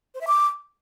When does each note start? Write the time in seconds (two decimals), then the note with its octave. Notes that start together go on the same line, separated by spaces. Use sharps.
0.15 C5
0.21 E5
0.27 D6